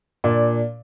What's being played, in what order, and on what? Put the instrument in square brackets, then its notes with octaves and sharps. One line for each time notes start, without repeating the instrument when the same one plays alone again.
[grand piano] A#2 D4 D5